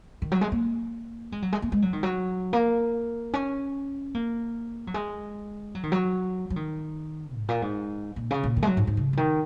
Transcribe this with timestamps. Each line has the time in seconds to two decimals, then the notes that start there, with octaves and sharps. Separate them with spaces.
0.22 D#3
0.32 F#3
0.41 G#3
0.52 A#3
1.32 G#3
1.42 F#3
1.53 G#3
1.62 A#3
1.72 G#3
1.82 F#3
1.93 D#3
2.03 F#3
2.53 A#3
3.33 C#4
4.15 A#3
4.87 F#3
4.94 G#3
5.75 F#3
5.83 D#3
5.92 F#3
6.50 F#3
6.56 D#3
7.36 G#2
7.49 A#2
7.62 G#2
8.16 A#2
8.31 C#3
8.44 A#2
8.57 D#3
8.62 G#3
8.67 F#3
8.77 G#2
8.87 G#2
8.97 C#3
9.13 C#3
9.17 D#3